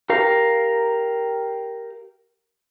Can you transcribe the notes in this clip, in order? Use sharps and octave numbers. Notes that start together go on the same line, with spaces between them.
G4 A#4 F5